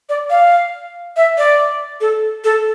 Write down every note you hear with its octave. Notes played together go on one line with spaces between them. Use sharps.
D5
F5
E5
D5
A4
A4